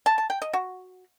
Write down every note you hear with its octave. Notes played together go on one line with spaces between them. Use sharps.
A5
A5
G5
D#5
F#4